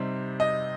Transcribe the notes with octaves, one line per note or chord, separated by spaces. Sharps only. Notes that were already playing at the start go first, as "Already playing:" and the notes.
Already playing: C3 G3 C4 D#4
D#5